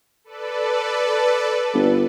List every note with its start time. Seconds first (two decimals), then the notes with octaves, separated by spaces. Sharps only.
0.24 A4 B4 D5
1.74 G1